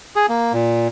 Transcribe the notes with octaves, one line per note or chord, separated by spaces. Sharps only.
G#4
A#3
A#2